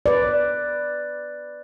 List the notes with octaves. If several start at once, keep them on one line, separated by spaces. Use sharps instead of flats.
B4 D5